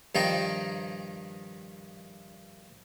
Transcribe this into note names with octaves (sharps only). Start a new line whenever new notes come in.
G2 D#3 F3 D#4 G5 A#5